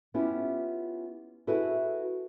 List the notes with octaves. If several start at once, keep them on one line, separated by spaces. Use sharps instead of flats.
B3 C#4 E4 F4 G4
E4 F#4 G#4 A4 B4